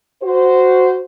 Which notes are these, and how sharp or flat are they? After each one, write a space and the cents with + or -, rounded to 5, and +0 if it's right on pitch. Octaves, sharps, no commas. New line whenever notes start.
F#4 +0 C5 -15